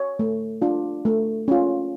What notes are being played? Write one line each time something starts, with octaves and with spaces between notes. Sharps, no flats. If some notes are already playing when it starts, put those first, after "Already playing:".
Already playing: C#5
A3
D4 F4
A3
C#4 F4